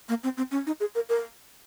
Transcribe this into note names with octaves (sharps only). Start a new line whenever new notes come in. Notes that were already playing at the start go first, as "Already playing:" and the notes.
A#3
C4
C4
C#4
D#4
G#4
A#4
A#4